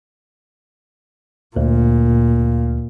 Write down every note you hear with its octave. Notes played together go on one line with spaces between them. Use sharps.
D2 A#2